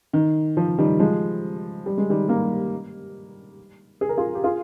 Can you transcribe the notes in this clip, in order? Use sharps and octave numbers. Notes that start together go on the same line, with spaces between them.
D#3
F3
D#3 G3
F3 G#3
G3
G#3
D#3 G3
G3 A#3
G#4
A#4
F4 G#4
G4
F4 G#4